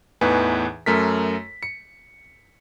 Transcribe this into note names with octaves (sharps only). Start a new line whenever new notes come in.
E2 A2 E3 D#4 B4 G#5
F#2 A3 A#4 B6
C#7